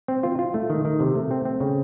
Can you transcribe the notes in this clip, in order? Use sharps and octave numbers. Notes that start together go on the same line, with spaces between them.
C4
F4
F4
A3
D#3
D#3
C3
A3
C4
C4
C#3